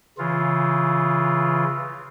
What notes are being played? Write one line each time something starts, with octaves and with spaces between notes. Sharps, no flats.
C#3 E3 F4